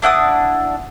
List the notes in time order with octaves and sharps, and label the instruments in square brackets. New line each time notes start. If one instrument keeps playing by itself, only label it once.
[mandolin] D4 E4 F#5 D#6